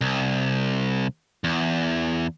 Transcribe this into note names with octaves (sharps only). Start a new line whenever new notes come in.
C2
E2